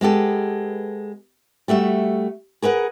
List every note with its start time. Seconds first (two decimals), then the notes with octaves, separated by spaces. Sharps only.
0.01 G#3 B3 G4 A4
1.68 G3 A3 F#4 E5
2.62 G#4 A#4 B4 F#5